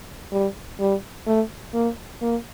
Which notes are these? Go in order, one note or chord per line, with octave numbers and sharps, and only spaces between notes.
G3
G3
A3
A#3
A#3